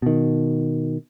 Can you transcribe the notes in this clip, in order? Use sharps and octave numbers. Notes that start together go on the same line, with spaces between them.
B2 D#3